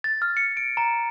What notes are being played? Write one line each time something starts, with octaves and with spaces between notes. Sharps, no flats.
A6
F6
C#7
D7
A#5